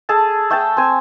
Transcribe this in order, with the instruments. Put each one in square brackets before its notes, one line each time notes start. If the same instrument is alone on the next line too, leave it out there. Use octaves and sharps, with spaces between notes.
[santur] G#4 A4 A5
A3 G5 A5
C4 G#5